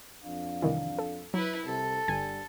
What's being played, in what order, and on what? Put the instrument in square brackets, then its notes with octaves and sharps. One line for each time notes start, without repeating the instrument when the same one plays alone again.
[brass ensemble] F2 D4 F5
[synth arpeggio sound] C2 D#3 E3
A4
[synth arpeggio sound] F#3 [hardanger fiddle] E4 B4
[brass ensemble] C2 C3 [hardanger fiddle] A4
[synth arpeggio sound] G1 G#5 [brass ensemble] G2 G3